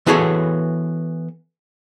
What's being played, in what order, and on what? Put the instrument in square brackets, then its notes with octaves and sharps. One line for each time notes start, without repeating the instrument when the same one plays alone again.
[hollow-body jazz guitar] E3 B3 F#4 G#4 A4 C#5